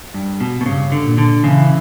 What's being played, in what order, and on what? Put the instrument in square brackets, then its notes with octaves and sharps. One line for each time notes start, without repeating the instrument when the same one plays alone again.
[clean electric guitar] G2
B2
B2
[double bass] G2 [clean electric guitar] C#3
[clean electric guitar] D3
[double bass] A#2
[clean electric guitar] D3
[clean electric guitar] C#3 [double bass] E3